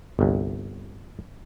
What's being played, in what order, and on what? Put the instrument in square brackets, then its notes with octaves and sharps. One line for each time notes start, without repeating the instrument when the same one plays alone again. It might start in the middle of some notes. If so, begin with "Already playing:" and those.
[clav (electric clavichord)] G1 C2